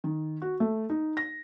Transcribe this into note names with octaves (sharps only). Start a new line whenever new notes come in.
D#3
F#4
A3
D#4
A#6